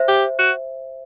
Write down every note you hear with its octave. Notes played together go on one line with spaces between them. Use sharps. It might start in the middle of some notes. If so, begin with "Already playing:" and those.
Already playing: C5 E5
G4
F#4